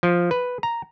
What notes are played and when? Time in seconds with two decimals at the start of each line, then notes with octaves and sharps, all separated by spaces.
0.03 F3
0.31 B4
0.63 A#5